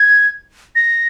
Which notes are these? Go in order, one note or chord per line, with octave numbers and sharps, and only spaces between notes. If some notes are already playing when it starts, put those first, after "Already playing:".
Already playing: G#6
A#6